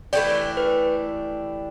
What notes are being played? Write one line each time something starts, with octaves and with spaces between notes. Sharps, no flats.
E3 A3 D4 G4 D5
B4